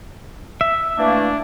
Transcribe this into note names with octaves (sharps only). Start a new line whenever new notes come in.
E5
E3 A3 A#3 D4